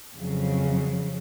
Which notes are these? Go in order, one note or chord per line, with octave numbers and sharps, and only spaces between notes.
F2 C#3 F#3